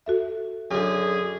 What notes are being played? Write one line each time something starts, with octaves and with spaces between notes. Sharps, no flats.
F#4 A4 E5
F#2 D3 G#4